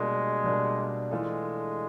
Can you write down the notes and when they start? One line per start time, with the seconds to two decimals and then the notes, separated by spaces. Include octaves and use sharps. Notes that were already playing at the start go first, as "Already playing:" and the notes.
Already playing: B2 G3 G#3 A#3 D4
0.44 B2 G3 A#3 D4
1.11 E3 G#3 A3 D4 F4 A4